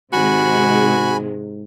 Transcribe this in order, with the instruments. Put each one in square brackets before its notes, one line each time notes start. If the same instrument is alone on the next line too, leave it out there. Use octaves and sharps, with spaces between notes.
[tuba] G#2 [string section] C3 D#3 G#3 [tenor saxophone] F#4 [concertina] G#5 B5